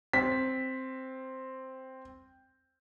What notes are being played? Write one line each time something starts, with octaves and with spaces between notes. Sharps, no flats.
C4 B6